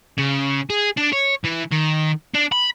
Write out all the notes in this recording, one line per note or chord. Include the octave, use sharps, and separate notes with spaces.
C#3
G#4
D4
C#5
E3
D#3
D4
B5